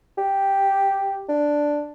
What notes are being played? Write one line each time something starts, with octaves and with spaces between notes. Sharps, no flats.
G4
D4